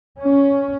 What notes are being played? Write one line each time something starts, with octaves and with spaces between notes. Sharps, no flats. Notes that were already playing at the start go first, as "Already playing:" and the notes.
C#4